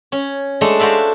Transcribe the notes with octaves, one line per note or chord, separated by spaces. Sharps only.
C#4
G#3 A3 D4 A4
F#4 C5 D5 E5 F5